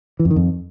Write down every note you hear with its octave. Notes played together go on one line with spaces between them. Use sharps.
E3
F2
D#3
F2